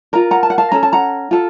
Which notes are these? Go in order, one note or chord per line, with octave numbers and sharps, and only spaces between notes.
F4 A#4 A#5
F#5 A#5
A5
F#5
F5 A5
C#4 A4 A#5
A5
F#5 A#5
F4 A4